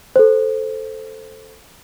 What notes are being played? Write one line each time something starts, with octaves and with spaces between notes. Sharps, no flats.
A4 C5